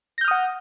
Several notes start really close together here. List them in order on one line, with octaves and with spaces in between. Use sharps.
A#6 G6 F6 D#6 F#5